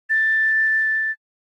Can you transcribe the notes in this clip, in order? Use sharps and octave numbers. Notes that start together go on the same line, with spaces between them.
A6